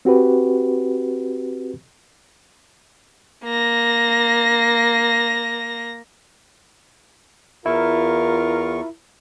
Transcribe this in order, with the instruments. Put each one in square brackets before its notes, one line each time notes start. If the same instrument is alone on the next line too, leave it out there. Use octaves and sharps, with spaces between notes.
[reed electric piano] C4 F#4 G4 B4
[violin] A#3 A#6
[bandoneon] E2 C#6 [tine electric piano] E4 [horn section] F4 A#4